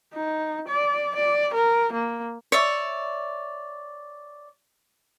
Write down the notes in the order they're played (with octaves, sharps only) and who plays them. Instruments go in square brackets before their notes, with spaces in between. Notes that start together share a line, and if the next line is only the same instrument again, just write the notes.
[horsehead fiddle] D#4
D5
D5
A#4
A#3
[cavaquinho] C#5 D5 E5